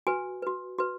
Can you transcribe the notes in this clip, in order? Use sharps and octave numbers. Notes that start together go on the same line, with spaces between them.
F#4 B4 G#5
F#4 B4
F#4 B4